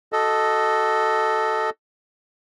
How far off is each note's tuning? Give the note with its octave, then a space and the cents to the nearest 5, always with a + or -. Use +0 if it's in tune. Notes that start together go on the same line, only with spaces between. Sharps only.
F#4 +20 A4 +0 D#5 +0